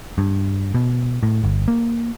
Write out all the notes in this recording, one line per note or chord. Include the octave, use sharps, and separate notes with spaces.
G2
B2
A2
G1
A#3